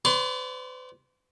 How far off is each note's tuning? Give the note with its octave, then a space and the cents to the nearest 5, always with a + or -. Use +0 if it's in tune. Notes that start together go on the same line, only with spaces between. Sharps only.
B4 +45 D5 -40 C6 +10